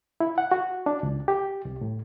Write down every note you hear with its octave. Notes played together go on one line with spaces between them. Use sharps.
E4
F#5
F#4
D4
C#2
G4
C2
A2